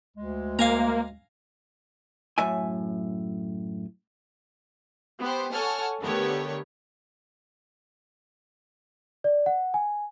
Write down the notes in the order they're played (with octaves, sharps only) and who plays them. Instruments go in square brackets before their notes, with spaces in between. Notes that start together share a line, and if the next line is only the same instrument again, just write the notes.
[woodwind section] D2 G#3
[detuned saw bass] A#3 [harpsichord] F5 G#5 A#5
[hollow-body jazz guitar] F#2 A2 E5 G#5
[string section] B3 G4 C5
A4 C#5 F#5 G#5 A5 F6
D3 A3 B3 G4 A#4 C#5
[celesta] D5
F#5
G#5